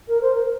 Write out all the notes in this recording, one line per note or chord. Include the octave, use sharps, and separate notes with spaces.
A#4
C5
A#4